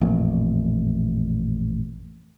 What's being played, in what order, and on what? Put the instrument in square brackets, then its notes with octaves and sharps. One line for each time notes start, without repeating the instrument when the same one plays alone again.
[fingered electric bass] A1 F2 A#2